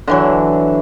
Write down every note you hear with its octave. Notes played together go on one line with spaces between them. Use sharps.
D3 E3 F#3